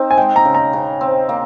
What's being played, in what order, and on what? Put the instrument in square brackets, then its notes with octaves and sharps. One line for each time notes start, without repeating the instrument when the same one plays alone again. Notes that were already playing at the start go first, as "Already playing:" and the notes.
Already playing: [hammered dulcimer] C4 D#4
[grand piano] G#5
[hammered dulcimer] G#3 [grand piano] G5
[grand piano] A#5
[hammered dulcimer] C#3
[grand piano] A#5
[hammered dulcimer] C#3
C4
A#3